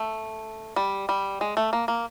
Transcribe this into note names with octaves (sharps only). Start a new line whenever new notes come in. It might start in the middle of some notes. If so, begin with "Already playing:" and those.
Already playing: A3
G3
G3
G#3
A3
A#3
A#3